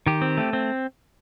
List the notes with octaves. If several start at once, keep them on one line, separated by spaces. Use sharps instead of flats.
D#3 G4
C4
A3
C4